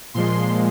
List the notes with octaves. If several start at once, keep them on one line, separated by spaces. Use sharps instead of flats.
A#2 F3 G#3 C6